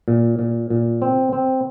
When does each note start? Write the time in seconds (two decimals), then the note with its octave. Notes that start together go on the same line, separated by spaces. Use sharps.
0.08 A#2
0.39 A#2
0.70 A#2
1.02 C4
1.33 C4